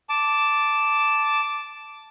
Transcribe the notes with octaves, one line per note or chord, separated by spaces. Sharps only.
A5 D6